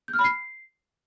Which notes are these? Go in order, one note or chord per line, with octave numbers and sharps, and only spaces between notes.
G6
F6
B5
C7